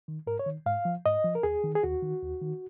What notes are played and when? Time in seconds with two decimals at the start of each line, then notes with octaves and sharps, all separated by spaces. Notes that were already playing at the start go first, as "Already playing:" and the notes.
0.08 D#3
0.27 G#2 A#4
0.39 C#5
0.46 D#3
0.66 G#2 F5
0.85 F3
1.05 G#2 D#5
1.24 F3
1.35 A#4
1.43 D#2 G#4
1.64 D#3
1.75 G#4
1.83 D#2 F#4
2.02 D#3
2.22 D#2
2.42 D#3